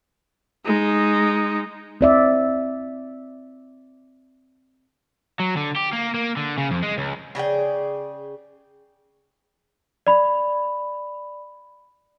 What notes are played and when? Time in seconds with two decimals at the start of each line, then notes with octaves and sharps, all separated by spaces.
0.65 G#3 D#4
2.01 C4 D5 E5
5.40 F#3
5.57 D3
5.76 G4
5.93 A#3
6.14 A#3
6.37 D3
6.58 C#3
6.71 F2
6.83 G#3
6.98 C#2
7.35 C#3 G#4 D5 G5
10.07 D5 B5